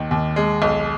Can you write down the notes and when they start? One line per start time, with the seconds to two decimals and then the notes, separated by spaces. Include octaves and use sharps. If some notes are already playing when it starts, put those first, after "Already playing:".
Already playing: D#2 D#3
0.11 D#2
0.36 G#3
0.62 B1